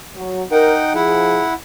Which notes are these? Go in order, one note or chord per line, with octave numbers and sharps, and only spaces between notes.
F#3
D#4 A#4 F#5 G5
F3 E4 G#4 F#5